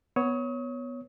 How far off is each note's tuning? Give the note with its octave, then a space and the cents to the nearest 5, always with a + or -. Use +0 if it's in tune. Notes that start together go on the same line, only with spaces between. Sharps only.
B3 +0 C#5 +0 D#6 +40